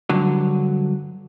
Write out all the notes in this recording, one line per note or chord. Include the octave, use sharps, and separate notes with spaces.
G2 D3 F#3